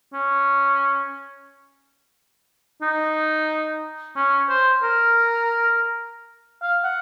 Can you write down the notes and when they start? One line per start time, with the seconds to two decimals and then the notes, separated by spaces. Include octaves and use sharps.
0.13 C#4
2.82 D#4
4.16 C#4
4.49 C5
4.83 A#4
6.62 F5
6.84 F#5